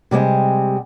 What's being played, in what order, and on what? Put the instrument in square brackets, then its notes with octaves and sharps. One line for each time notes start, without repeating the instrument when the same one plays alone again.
[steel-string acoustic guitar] C3 G3 G#3 C4